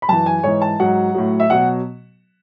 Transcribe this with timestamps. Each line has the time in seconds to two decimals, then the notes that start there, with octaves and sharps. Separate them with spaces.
0.02 B5
0.09 F#2 E3 A5
0.26 G#5
0.43 G#2 E3 C#5
0.62 A5
0.80 G#2 F#3 F#5
1.15 A2 F#3
1.40 E5
1.50 B2 F#3 F#5